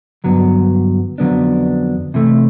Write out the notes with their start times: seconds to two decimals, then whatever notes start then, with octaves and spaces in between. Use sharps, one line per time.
0.24 G2 D3 F#3 B3
1.18 F2 D3 F#3 B3 D4
2.14 C3 E3 A3